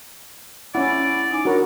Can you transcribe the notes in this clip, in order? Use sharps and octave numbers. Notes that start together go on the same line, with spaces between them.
C#4 E4 D5 F#5
D#4 G#5 D6
D4 F#4 A#4 C#5 B5